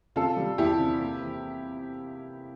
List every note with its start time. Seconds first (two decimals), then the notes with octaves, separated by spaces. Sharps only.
0.16 C3 F4 A4
0.37 G3
0.58 E2 E4 G4
0.79 C3
1.00 A#3
1.21 E3